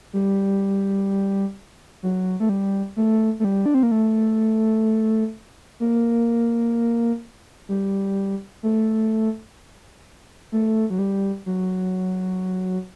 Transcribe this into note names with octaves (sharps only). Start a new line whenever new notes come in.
G3
F#3
A3
G3
A3
A3
G3
D4
C4
A#3
A3
A#3
G3
A3
A3
F#3
G3
F#3